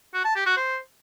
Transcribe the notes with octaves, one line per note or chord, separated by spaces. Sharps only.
F#4
A5
G4
F#4
C5